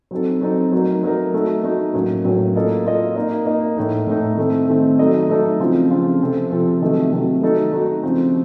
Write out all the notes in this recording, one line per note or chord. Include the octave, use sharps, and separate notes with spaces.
F#3 C4 D#4 A4
F#3 C4 D#4 A4
F#3 A3 D#4 A#4
F#3 A3 D#4 A#4
A3 D#4 F#4
A3 D#4 F#4
A2 F#3 A#3 C#4
A2 F#3 A#3 C#4
A#3 F4 A4 D#5
A#3 F4 A4 D#5
A#3 D#4 A#4 D#5
A#3 D#4 A#4 D#5
A2 A3 D#4
A2 A3 D#4
D#3 A3 C4
D#3 A3 C4
F#3 A3 D#4 A4 D#5
F#3 A3 D#4 A4 D#5
C#3 F3 C4 F4
C#3 F3 C4 F4
C3 F3 C4 F4 A4
C3 F3 C4 F4 A4
C3 D#3 F#3 A3
C3 D#3 F#3 A3
A3 D#4 F#4 A4
A3 D#4 F#4 A4
C#3 F3 C4